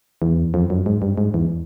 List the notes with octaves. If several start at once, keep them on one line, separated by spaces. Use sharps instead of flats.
E2
F2
F#2
G#2
G2
G#2
E2